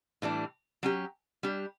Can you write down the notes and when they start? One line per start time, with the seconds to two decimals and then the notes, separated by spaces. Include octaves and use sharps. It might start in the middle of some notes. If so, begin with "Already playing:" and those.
0.22 A2 E3 G3 D4
0.83 F#3 C#4 G4
1.43 G3 D4 G4